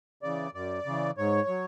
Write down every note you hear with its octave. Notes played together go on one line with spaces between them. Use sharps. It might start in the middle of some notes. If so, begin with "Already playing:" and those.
C#3 E3 D5
F#2 D5
C#3 E3
G#2 C#5
F#3